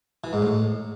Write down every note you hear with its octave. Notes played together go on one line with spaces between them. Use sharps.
E3
G#2
A2